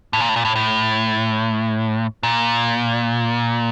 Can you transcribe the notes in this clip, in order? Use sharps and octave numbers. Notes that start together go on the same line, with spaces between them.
A2
A#2
A2
A#2
A2
A2
A#2